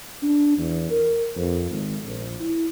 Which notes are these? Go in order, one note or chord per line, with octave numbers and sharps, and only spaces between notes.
D4
E2
A#4
F2
G#1
A#1
E4